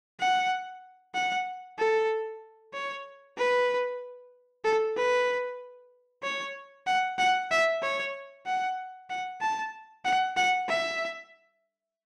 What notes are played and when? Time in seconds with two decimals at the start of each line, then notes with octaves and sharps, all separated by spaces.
0.20 F#5
1.14 F#5
1.78 A4
2.73 C#5
3.37 B4
4.64 A4
4.96 B4
6.23 C#5
6.87 F#5
7.18 F#5
7.51 E5
7.82 C#5
8.46 F#5
9.10 F#5
9.41 A5
10.05 F#5
10.37 F#5
10.68 E5